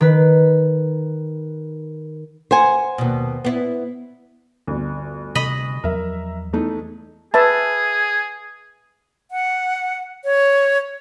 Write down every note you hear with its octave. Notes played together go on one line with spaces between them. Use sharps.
D#3 B4
C5 F#5 G#5
D#2 B2
B3 E4
G1 D2
C3 D#5 B5
E2 F3 F#3 A#4 E5
E2 A3 D#4
G#4 B4 E5 A5
F#5
C#5